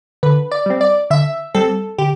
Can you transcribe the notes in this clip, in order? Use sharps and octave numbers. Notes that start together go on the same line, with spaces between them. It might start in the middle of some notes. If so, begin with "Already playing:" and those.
D3 B4
D5
G3 C4
D5
D3 E5
G3 C4 A4
D3 G4